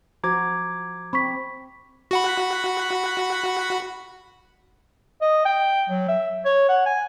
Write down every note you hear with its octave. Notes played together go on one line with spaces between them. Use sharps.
F3 F#4 C5 A#5 D6 G#6
C4 B5 C#6 B6
F#4 F#5 B5
D#5
G5
F#3
E5
C#5
F#5
G#5